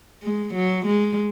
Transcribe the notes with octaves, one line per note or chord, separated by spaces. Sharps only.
G#3
F#3
G#3